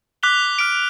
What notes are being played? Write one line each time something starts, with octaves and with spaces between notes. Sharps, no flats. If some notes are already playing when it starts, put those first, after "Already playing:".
D6 F#6 B6 F7 G7
F6 B6 D7